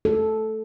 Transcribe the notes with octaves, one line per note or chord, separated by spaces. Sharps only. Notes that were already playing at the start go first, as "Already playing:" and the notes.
A4